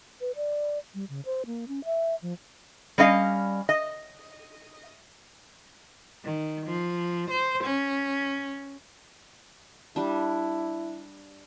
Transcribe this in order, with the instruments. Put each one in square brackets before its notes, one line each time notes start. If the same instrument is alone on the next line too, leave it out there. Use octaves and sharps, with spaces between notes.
[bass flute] B4
D5
G3
C#3
C5
A#3
C#4
E5
F3
[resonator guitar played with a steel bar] G3 C#4 D#5 F5
D#5
[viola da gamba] D#3
F3
C5
C#4
[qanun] G3 D4 [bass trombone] E4